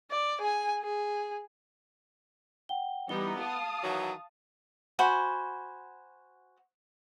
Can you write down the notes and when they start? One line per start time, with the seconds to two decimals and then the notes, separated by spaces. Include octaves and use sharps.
0.11 D5
0.41 G#4 G#5
0.83 G#4
2.69 F#5 G5 G7
3.09 E3 G3 B3 D#4 G7
3.40 F5 A5 D#6
3.83 D#3 E3 F#3
4.99 F#4 C5 G#5 B5